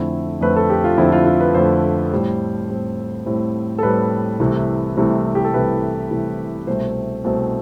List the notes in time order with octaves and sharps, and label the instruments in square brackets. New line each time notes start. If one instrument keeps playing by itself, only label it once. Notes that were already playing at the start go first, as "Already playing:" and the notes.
Already playing: [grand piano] F2 D3 A3 C4 E4
F2 D3 A3 C4 B4
A4
G4
F4
F2 D3 A3 C4 E4
F4
F4
B4
F2 D3 A3 C4 C5
A2 G3 C4
A2 G3 C4
A2 G3 C4
A4
A2 G3 C4 B4
C2 C3 E3 A3
C2 C3 E3 A3
G4
A4
C2 C3 E3 A3 B4
C2 C3 E3 A3
C2 B2 A3 C4 C5
C2 B2 A3 C4